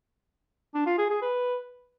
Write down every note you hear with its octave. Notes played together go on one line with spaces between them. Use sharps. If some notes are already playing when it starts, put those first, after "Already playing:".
D4
F4
G#4
G#4
B4